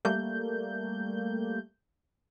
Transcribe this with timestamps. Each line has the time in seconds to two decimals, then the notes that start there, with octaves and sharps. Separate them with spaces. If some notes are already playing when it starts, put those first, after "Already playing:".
0.05 G3 A3 A#3 G6